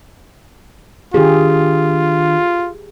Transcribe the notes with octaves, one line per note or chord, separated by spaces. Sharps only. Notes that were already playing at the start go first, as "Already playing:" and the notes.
D#3 D4 F4 G4 G#4